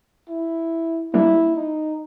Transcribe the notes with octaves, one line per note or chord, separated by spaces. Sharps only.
E4
G3 A#3 D4 E4
D#4